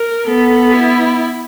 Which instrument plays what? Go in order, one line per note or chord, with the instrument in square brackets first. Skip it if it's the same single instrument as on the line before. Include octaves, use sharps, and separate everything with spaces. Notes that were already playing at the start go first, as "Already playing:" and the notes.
Already playing: [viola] A#4
[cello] B3 [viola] A4
[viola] E4